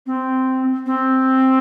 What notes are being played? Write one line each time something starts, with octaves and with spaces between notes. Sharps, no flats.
C4
C4